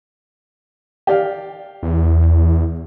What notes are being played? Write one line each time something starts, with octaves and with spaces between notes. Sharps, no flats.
G4 D5 F5
E2